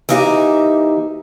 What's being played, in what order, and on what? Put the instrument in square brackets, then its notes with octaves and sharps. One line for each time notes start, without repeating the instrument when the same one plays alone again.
[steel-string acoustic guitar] E3 A#3 D#4 G4 E5 G#5